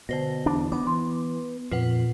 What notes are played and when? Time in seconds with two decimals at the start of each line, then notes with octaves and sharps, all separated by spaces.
0.09 B2 D3 C5 A#6
0.46 E2 D4
0.72 B3 D6
0.87 E3 C6
1.72 F2 A#2 F4 B4 F#5